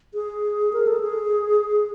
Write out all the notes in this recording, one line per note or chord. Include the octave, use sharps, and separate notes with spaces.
G#4
A#4
A4
G#4